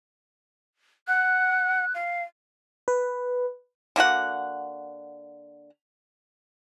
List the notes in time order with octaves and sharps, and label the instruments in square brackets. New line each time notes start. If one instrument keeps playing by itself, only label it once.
[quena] F#5 [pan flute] F#6
[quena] F5
[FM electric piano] B4
[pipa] D3 A#3 F#4 F#5